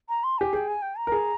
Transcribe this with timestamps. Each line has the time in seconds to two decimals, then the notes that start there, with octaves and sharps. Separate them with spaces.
0.09 A#5
0.23 C6
0.38 G4 G#5
0.53 G#4 G5
0.68 G#5
0.82 G5
0.97 A#5
1.07 A#4
1.12 G#4